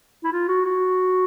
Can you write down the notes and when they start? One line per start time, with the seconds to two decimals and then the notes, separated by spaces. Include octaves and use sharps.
0.24 E4
0.32 F4
0.48 F#4
0.65 F#4